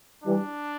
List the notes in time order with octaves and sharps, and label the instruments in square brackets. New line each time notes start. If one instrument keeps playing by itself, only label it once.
[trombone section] E3 G3 [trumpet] D4